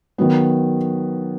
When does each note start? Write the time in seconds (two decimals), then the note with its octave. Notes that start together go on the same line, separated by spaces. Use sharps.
0.18 D#3 F#3 B3